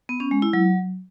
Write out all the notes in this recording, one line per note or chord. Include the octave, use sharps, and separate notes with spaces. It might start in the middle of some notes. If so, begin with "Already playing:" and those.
B3
C#4
G#3
E4
F#3